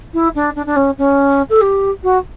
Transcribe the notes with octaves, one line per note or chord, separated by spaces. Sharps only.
E4
D4
D4
D4
C#4
C#4
A4
G4
F#4